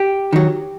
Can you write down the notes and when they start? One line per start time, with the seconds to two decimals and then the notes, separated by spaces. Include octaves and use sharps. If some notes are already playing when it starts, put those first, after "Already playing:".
Already playing: G4
0.33 D#3 F#3